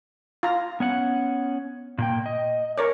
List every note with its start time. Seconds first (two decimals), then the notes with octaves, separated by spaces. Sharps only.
0.43 F4 A#5
0.80 B3 C#4 F#5
1.98 A#2 A#3 G5
2.26 D#5
2.78 A#4 C#5 D5